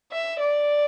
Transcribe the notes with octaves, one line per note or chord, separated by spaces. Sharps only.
E5
D5